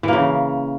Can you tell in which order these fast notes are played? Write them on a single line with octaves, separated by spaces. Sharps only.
E3 A#3 C#3